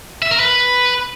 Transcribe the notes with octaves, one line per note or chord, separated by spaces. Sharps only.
E5
A#4
B4